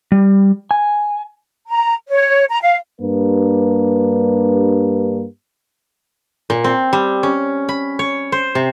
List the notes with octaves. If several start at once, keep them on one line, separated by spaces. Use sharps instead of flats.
G3
G#5
A#5
C#5
A#5
F5
G2 A#3 D4 G4 B4
A#2
C4
G3
C#4
B5
C#5
C5
C3